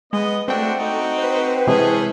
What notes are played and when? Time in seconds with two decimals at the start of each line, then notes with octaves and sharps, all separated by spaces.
0.13 G#3 B3 D#5
0.48 A3 C4 D4 F#4 G5
0.79 D#4 F#4
1.18 B4 C5
1.67 C3 E3 G#3 C#4 G#4 A4